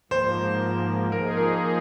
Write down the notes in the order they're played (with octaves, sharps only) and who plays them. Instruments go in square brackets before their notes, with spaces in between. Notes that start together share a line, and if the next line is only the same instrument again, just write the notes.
[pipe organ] G#2 F3 A#3 [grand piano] C5
[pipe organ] F3 A#3 D#4 G#4 [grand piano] A#4
[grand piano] A#4